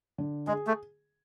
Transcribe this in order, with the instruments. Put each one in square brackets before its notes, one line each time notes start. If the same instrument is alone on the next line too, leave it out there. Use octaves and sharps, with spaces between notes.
[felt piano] D3
[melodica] G#3 [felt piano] G#4
[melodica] A3